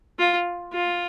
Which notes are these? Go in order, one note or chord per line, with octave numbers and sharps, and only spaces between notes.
F4
F4